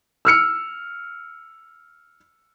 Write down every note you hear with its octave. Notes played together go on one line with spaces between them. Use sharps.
E6 F6 C#7